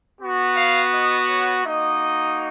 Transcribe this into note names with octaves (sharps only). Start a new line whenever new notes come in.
B3 F#4
F5
D#5
C#5
A#3 D#4 F#4 D#5